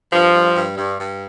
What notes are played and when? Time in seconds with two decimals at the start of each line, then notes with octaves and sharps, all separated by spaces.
0.13 G2 F3
0.34 G2
0.56 G2
0.77 G2
0.99 G2